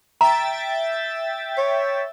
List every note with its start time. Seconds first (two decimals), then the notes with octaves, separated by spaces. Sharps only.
0.21 E5 G5 A#5 A6
1.58 C#5